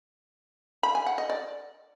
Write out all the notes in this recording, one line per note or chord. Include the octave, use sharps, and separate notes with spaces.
B5
G#5
F#5
D#5
D5